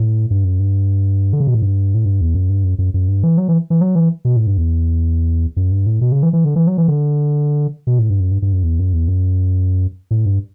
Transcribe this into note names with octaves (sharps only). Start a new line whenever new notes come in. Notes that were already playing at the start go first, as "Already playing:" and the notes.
Already playing: A2
G2
F#2
G2
D3
C#3
B2
A2
G2
A2
G2
E2
F#2
G2
F#2
F#2
F#2
G2
E3
F#3
E3
E3
F#3
E3
B2
A2
G2
E2
F#2
G2
A2
B2
C#3
E3
E3
D3
E3
F#3
E3
D3
B2
A2
G2
F#2
G2
G2
F#2
E2
F#2
E2
F#2
A2
G2